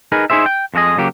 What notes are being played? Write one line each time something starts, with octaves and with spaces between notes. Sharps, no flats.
D#4 G#4 A#4 B4
D#4 E4 G#4 C5 E5
G5
F2 F3 F#4 G#4 D#5
C#3 F#3 A#3 G4